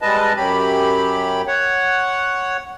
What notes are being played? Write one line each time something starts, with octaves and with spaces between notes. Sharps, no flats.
G3 G#3 B4 D#5 A5
F#2 F#3 G4 B5
C#5 F#5